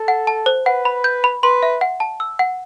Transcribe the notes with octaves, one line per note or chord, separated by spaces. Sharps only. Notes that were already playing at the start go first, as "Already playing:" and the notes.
Already playing: A4
F#5
A5
C5
B4 F#5
B5
G6
B5
B4 C6
E5
F#5
A5
E6
F#5